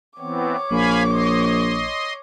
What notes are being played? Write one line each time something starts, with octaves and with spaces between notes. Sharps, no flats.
E3 B3 C4 C#5 D6
A#1 F5 G#5 B5
D#5 C6